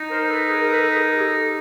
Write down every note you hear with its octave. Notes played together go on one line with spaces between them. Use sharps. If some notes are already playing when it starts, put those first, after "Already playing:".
Already playing: D#4
A#4 C5
A4 B4
G#4 A#4
A#4
A4 B4
G#4 A#4
A#4
G4 A4